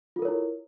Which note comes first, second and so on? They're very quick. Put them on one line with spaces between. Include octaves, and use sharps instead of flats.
F4 A4 A#4 C#5 E4